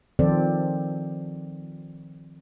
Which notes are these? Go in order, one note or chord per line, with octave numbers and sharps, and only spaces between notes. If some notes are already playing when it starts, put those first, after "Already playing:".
D#3 F3 C4 A4 C5 D5